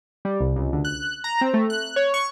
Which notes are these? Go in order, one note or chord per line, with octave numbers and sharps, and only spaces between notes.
G3
C2
C#2
D2
F#6
A#5
C4
A3
F#6
C#5
C#6